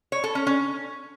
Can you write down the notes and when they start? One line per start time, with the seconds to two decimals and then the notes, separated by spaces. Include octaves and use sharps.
0.12 C#5
0.24 A4
0.35 C#4
0.47 C#4